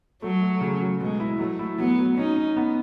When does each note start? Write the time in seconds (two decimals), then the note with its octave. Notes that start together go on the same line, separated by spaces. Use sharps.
0.22 F#3 A3
0.42 A3
0.61 C#3
0.81 F#3
1.00 B2 G#3
1.20 E4
1.39 F#3 A3
1.59 E4
1.78 F#3 B3
1.99 F#3
2.18 C#4 D#4
2.36 C#4
2.57 B3